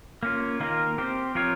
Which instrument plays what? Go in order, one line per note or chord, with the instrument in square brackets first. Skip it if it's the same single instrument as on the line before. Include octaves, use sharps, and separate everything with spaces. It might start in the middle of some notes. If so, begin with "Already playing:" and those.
[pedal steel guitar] A#3 C#4 F4
D#3 A#3 F4 A#4
C4 G4 C5
F3 C4 F4 A#4 C#5